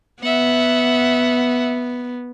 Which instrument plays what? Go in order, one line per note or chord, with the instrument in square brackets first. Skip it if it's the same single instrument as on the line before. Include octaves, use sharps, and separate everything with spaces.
[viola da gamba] B3 [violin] E5 F#5